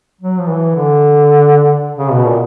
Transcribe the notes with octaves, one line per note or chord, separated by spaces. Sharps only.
F#3
F3
E3
D3
C#3
B2
A#2